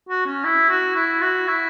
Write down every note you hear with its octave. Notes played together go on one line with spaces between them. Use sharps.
F#4
C#4
E4
F#4
E4
F#4
E4